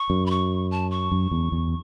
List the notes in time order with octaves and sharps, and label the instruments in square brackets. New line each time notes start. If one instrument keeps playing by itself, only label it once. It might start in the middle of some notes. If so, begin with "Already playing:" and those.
Already playing: [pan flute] C#6
[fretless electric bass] F#2
[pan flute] B5
C#6
A5
C#6
[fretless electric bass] F#2
E2
E2